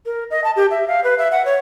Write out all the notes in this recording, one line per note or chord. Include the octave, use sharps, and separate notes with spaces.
A#4
D#5
A5
G4
E5
F5
B4
E5
F#5
C#5